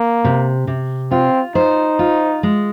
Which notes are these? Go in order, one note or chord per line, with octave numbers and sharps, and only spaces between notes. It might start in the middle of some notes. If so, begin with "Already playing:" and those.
Already playing: A#3
C3
C3
C4 F4
D#4 C5
F4
G#3